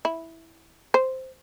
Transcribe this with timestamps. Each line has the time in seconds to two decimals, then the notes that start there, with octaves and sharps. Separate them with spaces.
0.05 E4
0.94 C5